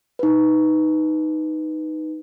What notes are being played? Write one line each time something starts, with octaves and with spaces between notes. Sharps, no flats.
D#4 B4